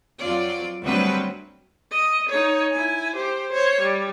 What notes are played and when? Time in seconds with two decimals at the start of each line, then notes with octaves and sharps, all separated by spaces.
0.20 F2 F#3 F4 D5
0.84 D2 F#3 G3 C4 B4
1.91 D#5
2.29 D#4 C#5
2.72 E4 G#5
3.15 G4 C5
3.52 C5 C#5
3.80 G3